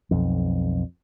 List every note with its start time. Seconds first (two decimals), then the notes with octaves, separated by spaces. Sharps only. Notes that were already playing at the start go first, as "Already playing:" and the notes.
0.11 B1 F2